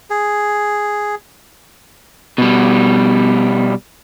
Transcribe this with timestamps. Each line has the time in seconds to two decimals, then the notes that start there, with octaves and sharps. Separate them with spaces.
0.10 G#4
2.38 B2 G3